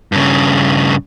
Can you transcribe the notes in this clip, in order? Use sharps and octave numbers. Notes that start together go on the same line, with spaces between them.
G2 C#3